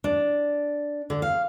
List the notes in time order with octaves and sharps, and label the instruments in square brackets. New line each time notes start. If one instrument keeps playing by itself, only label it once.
[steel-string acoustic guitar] D4
D3
F5